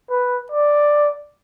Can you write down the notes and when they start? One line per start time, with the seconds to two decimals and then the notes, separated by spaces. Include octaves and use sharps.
0.10 B4
0.52 D5